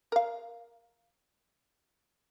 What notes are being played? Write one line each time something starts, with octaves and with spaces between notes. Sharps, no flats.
A#4 F5